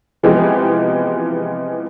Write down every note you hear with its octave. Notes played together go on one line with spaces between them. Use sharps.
C3 E3 F3 G#3 B3 G4